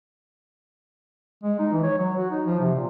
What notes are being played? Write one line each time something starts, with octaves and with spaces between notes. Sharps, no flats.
G#3
D#4
E3
C#5
F#3
F#4
D#4
F3
C3
A#2